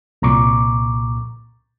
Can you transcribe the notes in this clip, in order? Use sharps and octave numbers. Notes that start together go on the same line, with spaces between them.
C2 A#2 A#5 C#6 D6